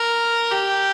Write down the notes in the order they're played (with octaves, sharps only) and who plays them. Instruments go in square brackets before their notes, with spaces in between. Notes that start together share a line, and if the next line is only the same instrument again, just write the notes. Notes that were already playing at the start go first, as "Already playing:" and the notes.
Already playing: [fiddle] A#4
G4